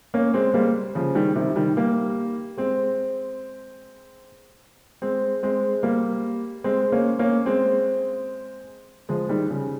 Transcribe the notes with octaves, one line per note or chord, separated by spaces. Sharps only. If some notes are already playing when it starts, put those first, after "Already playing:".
A#3 C#4
G#3 C4
G3 A#3
C#3 F3
D#3 G3
C3 D#3
D#3 G3
G3 A#3
G#3 C4
G#3 C4
G#3 C4
G3 A#3
G#3 C4
A#3 C#4
A#3 C#4
G#3 C4
F3 G#3
D#3 G3
C#3